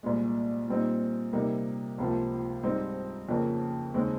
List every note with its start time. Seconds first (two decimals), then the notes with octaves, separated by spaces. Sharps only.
0.03 C2 A#2 G#3
0.68 A#2 G3 C4 D#4
1.33 C3 G3 A#3 D#4
1.98 C#2 C3 F3 A#3
2.63 G#2 G3 C4 D#4
3.29 F2 C#3 F3 A#3
3.94 D#2 C#3 G#3 C4 D#4